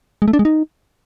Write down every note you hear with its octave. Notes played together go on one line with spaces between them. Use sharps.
G#3
A3
D4
G#3
D#4